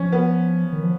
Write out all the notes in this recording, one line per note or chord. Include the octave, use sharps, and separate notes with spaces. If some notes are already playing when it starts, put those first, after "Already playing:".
Already playing: F3 C#4
B3
D#3
F3